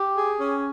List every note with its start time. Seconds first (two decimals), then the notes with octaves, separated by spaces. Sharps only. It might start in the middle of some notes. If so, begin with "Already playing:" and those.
Already playing: G4
0.15 G#4
0.39 C#4